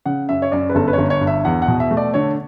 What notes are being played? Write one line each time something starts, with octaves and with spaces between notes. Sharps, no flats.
C#3 F#5
F#2 E5
C#5
F#2 D5
B4
G1 A4
B4
G1 C#5
C#5
G2
E5
E2 F#5
F#5
B2
E5
A3
D5
D3 C#5